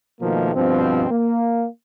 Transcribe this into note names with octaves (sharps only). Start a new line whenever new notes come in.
B2 D#3 F3 A3 A#3
G2 B2 F3 C4
A#3